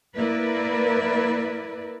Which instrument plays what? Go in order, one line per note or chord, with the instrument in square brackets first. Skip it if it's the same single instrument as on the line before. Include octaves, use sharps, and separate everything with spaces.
[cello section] A#3 E4 A#4 B4 D5